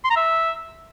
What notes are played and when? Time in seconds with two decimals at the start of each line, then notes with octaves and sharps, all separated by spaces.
0.04 C6
0.10 A#5
0.16 E5